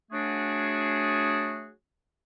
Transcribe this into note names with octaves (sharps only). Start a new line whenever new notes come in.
F#3 A3 D4 F#4 G#4